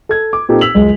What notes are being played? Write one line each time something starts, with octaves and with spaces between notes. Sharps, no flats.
A4 G#6
D6
A#2 C4 D#4 G4 A4
E6 B6 F7 F#7
C#2 F#2 G#3